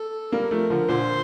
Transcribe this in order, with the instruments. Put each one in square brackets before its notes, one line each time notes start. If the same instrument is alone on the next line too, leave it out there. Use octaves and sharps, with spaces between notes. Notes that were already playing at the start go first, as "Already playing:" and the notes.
Already playing: [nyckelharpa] A4
[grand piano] G3 A#3 [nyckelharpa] A#4
[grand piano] F3 A3
D3 F3
[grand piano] A#2 D3 [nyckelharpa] C5